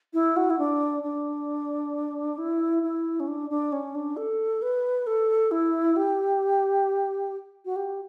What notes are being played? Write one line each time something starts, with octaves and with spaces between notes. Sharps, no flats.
E4
F#4
E4
D4
D4
E4
E4
C#4
D4
D4
C#4
D4
A4
B4
A4
E4
G4
F#4
G4